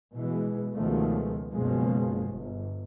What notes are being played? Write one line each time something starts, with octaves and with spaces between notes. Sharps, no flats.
B2 E3 G#3
C#2 B2 D#3 F3 G#3 A3
F#1 B2 F3 G#3
G1